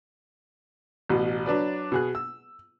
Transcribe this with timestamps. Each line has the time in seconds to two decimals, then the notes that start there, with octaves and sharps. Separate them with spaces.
1.10 A1 B2
1.46 F#3 D4 B4 D5
1.92 B2 G#4 F#6
2.15 E6